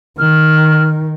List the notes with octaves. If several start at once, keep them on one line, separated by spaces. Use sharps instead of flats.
D#3 F6